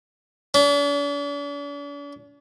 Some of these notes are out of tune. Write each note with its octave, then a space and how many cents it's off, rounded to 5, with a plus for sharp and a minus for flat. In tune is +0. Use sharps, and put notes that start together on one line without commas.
D4 -45